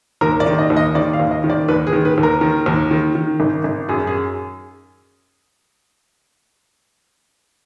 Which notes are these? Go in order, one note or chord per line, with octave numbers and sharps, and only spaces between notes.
D#2 A#4
D5
D#3
D#5
D#2
D#5
D#3 D5
F5
D#2
D#5
D#3
D5
D#2 B4
G#4
D#3
B4
D#2
A#4
D#3
D#2
D#3
D#3
G#1
G#1
F#2 G#4
G#4